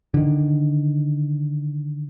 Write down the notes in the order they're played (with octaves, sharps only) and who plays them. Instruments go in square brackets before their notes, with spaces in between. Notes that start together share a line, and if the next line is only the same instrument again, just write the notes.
[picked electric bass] D3 D#3